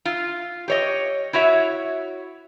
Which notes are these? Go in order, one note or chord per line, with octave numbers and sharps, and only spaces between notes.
F4
G4 C#5 D#5
E4 F#4 C#5 E5